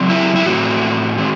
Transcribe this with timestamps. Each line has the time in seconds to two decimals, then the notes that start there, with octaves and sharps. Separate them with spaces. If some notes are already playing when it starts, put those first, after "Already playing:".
Already playing: C#3 F#3 C4
0.10 E4
0.36 E4
0.45 A2 E3 A3 C4 F#4
1.17 D#3 G#3 C4